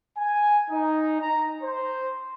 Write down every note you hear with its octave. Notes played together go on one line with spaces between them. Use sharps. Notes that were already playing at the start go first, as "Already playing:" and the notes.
G#5
D#4
A#5
C5